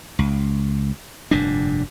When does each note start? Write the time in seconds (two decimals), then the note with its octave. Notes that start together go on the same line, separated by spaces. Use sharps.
0.19 C#2
1.31 F1 G2 A#2 D4